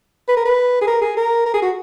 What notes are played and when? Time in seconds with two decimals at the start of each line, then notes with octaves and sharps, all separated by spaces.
0.28 B4
0.37 A#4
0.45 B4
0.81 G#4
0.87 A#4
1.01 G#4
1.17 A#4
1.46 A#4
1.54 G#4
1.62 F#4